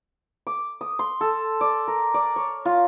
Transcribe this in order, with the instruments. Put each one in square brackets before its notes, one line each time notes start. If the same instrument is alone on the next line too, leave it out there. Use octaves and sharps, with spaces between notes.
[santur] D6
D#6
C6
A4
D5
A#4
D5
C#5
F4